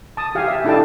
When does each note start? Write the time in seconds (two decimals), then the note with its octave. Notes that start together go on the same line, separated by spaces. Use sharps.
0.17 A5 D#6
0.35 G4 F5 G#5
0.47 E5 F5
0.65 D4 E4 A4 D#5 G5 A5